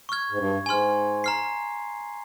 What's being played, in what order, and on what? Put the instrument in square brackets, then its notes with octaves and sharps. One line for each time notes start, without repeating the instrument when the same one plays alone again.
[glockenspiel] C#6 F6 G#6
[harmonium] G#2
G2
[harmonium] G#2 [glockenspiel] G#5 C6 F6
[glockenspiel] A#5 F6 C7